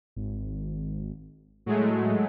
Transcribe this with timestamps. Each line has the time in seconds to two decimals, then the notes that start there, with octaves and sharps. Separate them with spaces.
0.16 G#1
1.66 A2 F#3 G#3 A3